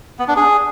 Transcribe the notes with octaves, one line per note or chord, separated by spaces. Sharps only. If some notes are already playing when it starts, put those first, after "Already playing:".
B3
D4
G#4